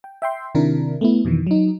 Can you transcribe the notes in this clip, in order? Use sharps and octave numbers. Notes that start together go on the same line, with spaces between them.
G5
E5 G5 C6
C3 D#3 D4 E4 A#4
A3 B3 E4
F2 B2 D#3 E3
F#3 D#4